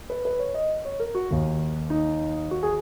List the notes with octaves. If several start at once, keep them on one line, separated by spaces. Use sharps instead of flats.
B4
B4
C#5
D#5
C#5
A#4
F#4
D#2 D#3
D#4
F#4
G#4